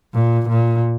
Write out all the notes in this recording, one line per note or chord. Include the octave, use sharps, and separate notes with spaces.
A#2
A#2